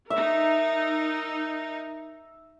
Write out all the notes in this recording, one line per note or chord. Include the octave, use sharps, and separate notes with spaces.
D#4 A#4 E5